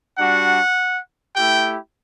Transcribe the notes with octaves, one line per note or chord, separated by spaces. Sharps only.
G3 D4 F#4 F#5
A3 E4 G4 G5